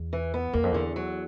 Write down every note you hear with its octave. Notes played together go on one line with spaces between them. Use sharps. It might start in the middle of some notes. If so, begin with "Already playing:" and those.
Already playing: E2
E3
B3
E2 A#3
F2
E2 D3
F#3